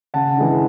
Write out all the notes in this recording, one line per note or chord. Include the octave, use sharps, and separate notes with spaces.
C#3 F#5 A5
E3 G#3 D4